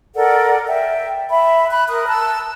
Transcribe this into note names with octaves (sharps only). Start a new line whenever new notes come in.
A4 A#4 D5 F#5
E5 G5
E5 B5
B5 F#6
A#4 D#6 F#6
A5 E6 F#6